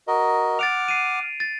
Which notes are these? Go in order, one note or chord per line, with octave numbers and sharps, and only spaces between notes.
F#4 A#4 D#5
F#5 D6 F6 A6 D7 F7
C7 D#7
A6